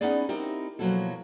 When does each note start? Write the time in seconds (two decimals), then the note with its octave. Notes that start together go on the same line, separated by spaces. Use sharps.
0.01 B3 C#4 D#4 E4 G#4 D5
0.29 C4 D#4 E4 G4 A#4
0.79 B2 F3 F#3 A#3 E4 A4